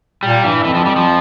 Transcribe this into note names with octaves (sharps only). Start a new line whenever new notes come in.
A#2 G3
G2 E3
F2 E3
F3
G3
F3